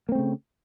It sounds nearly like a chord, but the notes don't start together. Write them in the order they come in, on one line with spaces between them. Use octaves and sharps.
A#3 C4 A3 C#3